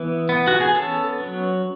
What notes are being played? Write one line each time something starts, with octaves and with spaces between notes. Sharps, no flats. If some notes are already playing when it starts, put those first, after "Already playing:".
Already playing: E3 B3
B3
F#4
G#4
C#4 A4
F#3